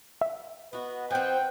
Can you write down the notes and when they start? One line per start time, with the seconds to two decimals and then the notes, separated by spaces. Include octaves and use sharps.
0.21 E5
0.73 B3 F#4 B4 D#5
1.11 F3 C4 F#5 G5